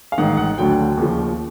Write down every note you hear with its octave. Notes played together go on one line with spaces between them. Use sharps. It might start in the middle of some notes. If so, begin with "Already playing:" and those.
F5
A1 G#2 D#3 F#5
F#5
D2 D3 F#3 G5
D#2 C#3 F3